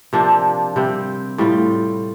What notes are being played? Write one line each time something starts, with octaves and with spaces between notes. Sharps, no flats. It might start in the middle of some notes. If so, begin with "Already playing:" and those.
C3 F3 A#3 D4
C3 G3 C4
A2 G3 C4 F4